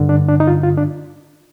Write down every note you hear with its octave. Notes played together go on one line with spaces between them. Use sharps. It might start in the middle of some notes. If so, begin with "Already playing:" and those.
Already playing: G2 D3
D4
D4
D#4
F4
F4
D4